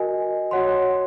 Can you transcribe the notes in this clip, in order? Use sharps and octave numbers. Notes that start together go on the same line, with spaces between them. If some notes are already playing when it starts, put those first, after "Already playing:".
Already playing: F#4 A#4 D#5 G#5
F#4 C#5 F#5 C6